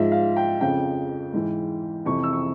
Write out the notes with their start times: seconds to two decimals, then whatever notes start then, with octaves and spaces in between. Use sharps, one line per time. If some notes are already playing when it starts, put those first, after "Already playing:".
Already playing: G#2 F3 E5
0.12 F5
0.37 G5
0.60 F2 C#3 F3 G5
1.33 G#2 E3
2.06 F2 C3 E3 C#6
2.23 E6
2.33 C#6